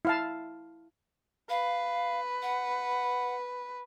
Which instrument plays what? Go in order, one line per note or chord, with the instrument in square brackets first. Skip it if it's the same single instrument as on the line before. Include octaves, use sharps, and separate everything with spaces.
[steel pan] E4 F5 A5
[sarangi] B4 [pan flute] F5
[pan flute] F#5